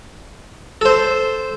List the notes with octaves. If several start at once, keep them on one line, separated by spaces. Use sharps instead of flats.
A4 C5